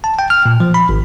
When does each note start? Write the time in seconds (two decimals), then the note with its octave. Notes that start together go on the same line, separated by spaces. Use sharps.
0.04 A5
0.19 G5
0.30 F6
0.46 A#2
0.60 F3
0.74 B5
0.89 G#1